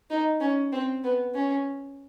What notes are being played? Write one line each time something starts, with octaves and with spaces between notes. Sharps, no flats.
D#4
C#4
C4
B3
C#4